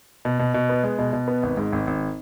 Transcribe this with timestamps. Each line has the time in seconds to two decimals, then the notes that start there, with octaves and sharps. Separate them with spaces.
0.25 B2
0.39 B2
0.54 B2
0.69 B3
0.84 G#3
0.99 B2
1.13 B2
1.28 B3
1.43 G#1
1.57 G#2
1.72 G#1
1.87 G#1